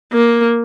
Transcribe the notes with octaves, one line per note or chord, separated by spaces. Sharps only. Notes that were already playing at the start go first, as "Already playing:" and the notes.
A#3